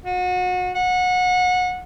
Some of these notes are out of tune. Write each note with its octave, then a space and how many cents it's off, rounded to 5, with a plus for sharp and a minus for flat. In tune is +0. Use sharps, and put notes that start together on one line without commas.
F#4 -30
F#5 -25